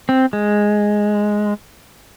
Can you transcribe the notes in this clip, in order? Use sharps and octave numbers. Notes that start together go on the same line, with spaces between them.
C4
G#3